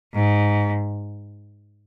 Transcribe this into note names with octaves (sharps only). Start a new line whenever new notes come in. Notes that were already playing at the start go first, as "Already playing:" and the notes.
G#2